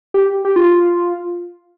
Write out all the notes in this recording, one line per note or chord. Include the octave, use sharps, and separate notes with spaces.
G4
G4
F4